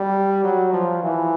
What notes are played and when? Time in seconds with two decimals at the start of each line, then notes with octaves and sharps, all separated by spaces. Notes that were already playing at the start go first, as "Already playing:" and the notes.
Already playing: G3
0.44 F#3
0.73 F3
1.03 E3